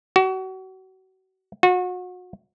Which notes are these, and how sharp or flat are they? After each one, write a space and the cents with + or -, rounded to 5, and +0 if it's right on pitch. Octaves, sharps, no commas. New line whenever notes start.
F#4 +30
F#4 -35